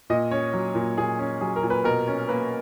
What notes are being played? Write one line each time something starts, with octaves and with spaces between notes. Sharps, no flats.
A#2 D#5
C#4 C#5
F#3
A#2
A#2 G#4
C#4
F#3 G#4
A#4
A#2
B4
B2 A#4
C#4
A#3 B4